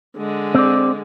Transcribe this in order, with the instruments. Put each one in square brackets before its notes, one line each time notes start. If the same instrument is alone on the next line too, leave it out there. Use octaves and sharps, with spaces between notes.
[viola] D3 G#3
[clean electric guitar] C4 D5